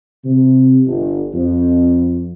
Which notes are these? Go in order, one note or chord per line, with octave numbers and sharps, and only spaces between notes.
C3
G1
F2